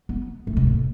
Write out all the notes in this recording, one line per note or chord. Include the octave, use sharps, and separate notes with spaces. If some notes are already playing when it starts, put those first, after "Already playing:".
B3
A3
B2
A2